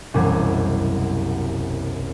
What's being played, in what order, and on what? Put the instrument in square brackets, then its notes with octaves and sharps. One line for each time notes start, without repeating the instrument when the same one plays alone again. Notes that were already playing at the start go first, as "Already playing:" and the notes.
[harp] E1 C2 F#2 G3 G#6